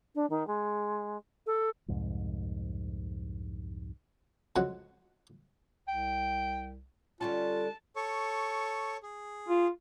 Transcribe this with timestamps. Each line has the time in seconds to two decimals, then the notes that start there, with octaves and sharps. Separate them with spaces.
0.15 D4
0.30 D#3
0.47 G#3
1.46 A4
1.88 C2 F2 G#2
4.56 F2 C#3 G#3 F#4 F#5
5.88 C2 G5
7.21 D3 G3 C#4 F4 A5
7.96 A4 C#5 C#6
9.03 G#4
9.48 F4